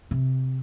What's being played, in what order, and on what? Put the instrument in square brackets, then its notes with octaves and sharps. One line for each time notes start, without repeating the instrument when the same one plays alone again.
[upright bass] C3